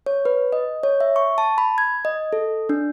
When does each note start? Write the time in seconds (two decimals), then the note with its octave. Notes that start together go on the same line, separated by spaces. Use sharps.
0.06 C#5
0.25 B4
0.53 D#5
0.83 C#5
1.01 E5
1.16 C#6
1.38 A5
1.58 B5
1.78 G#6
2.05 D#5
2.33 A4
2.69 D4